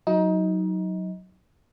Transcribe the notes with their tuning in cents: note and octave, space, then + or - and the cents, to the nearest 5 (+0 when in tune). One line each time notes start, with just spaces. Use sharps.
F#3 +0 D#4 +20